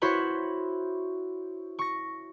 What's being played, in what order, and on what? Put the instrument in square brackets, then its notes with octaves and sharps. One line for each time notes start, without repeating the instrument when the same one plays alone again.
[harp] E4 F#4 C5 C#5 B5 C#6
C#6 A#6